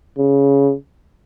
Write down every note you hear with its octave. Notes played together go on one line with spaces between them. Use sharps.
C#3